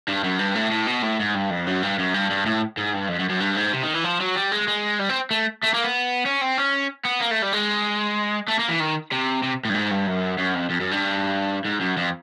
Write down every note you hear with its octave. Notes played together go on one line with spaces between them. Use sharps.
G2
F#2
G2
A2
A2
B2
A2
G#2
G2
F2
F#2
G2
F#2
G2
G2
A2
G#2
G2
F2
F#2
F#2
G2
G#2
C3
D#3
E3
F3
F#3
G3
G#3
G#3
G3
C4
A3
A3
A#3
B3
C#4
C4
C#4
B3
A#3
A3
G3
G#3
A3
A#3
E3
D#3
C3
C3
A2
G2
G#2
G2
F#2
F#2
F2
F2
F#2
G2
G#2
F#2
F2